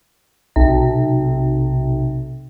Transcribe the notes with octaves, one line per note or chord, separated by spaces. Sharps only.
B1 C3